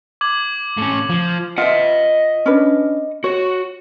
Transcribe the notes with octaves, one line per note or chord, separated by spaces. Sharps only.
D6 G#6 F#7
A2 C#4
F3
F4 D#5 E5 F#5
C#4 D4 B4
F#4 C#5